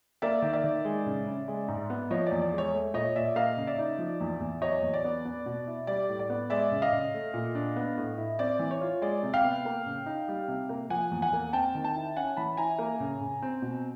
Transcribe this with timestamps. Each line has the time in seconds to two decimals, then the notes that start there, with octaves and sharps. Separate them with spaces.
0.22 A#3 D5 E5
0.42 D#3
0.53 D5 E5
0.64 D#3
0.85 G#3
1.06 C#3
1.27 C#3
1.48 G#3
1.68 G#2
1.90 B3
2.11 F3 C#5 D#5
2.27 E2 D5
2.41 D5
2.53 G#3
2.58 C#5
2.73 A3
2.94 A#2 C#5 D#5
3.16 A#2 D5 E5
3.36 A#3 D#5 F5
3.57 C#3
3.67 D5 E5
3.78 D#4
3.99 F3
4.20 E2
4.40 E2
4.62 F#3 C#5 D#5
4.82 E2
4.94 D5
5.04 B3
5.25 B3
5.46 B2
5.67 E4
5.87 G3 D5
6.09 A2
6.19 D5
6.30 B3
6.50 G#3 D5 E5
6.72 C#3
6.82 D#5 F5
6.92 C#3
7.14 A3
7.34 A#2
7.55 D4
7.76 B3
7.97 A2
8.18 E4
8.39 C4 D5
8.59 E3
8.71 C#5
8.81 F4
9.02 G#3 D5
9.23 C3
9.33 F5 G5
9.44 B3
9.65 A#3
9.86 C#3
10.06 D#4
10.28 G3
10.48 C3
10.69 A#3
10.90 F3 F#5 G#5
11.11 E2
11.22 F#5 G#5
11.33 A#3
11.53 C4 G5 A5
11.75 D#3
11.84 G5 A5
11.96 E4
12.16 C#4 F#5 G#5
12.36 E3 A5 B5
12.57 E4 G#5 A#5
12.79 A#3
13.00 C#3
13.21 C#3
13.42 C4
13.62 B2